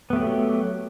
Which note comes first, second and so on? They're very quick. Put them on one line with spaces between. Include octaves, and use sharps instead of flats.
B3 A3 G4 F#3